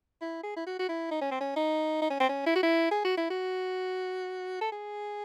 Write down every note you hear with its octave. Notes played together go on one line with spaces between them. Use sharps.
E4
G#4
E4
F#4
F#4
E4
D#4
C#4
C4
C#4
D#4
D#4
C#4
C4
C#4
E4
F#4
E4
G#4
F#4
E4
F#4
A4
G#4